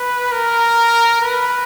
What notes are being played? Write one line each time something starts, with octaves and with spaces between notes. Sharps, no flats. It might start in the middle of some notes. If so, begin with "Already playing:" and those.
Already playing: B4
A#4
B4